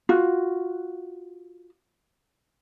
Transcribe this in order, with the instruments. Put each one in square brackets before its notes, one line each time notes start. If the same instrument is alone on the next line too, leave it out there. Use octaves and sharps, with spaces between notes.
[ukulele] F4 F#4